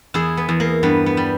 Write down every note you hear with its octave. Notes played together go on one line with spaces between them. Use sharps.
E2 E4 G#4
B3
E2
A#3
G2 B3
B3
G3